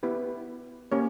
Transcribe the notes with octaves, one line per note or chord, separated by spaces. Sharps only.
B3 E4 G4 B4
A#3 C#4 G4 A#4 C#5